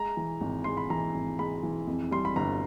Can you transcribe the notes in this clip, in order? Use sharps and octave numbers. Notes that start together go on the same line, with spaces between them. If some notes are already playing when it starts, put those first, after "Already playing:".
Already playing: G#3 A#5
E3
G#1
G#3 C6
B5
E3 A#5
G#1
G#3 B5
E3
F2
G3 C6
B5
G1 A#5